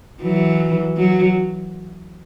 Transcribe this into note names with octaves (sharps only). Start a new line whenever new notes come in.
E3 F#3
F#3